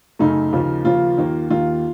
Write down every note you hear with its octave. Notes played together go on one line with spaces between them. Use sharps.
F#2 C#3 F#3 A3 D#4
D#2 C#3 F3 A#3
D#2 C#3 F3 A#3 F4
D#2 D#3 A#3
D#2 D#3 A#3 F4